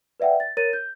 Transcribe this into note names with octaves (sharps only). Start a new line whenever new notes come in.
B4 D5 E5 F#5 G5
A6
A#4 C#5 A6 D#7
G6